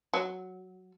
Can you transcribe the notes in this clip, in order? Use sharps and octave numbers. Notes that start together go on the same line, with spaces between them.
F#3